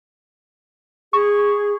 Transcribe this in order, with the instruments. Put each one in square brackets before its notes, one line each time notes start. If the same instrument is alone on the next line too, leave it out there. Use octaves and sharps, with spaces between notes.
[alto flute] G#4 [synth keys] C#6